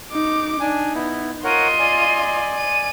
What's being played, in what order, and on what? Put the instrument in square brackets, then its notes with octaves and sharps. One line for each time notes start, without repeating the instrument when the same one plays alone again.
[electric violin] D#4 D6
[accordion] D4 G#5 [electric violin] D#4
[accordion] B3 E4
[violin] F4 D#7 [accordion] A#4 C#5 F#5 [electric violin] D#5 C6
[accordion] D5 G#5
[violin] D#7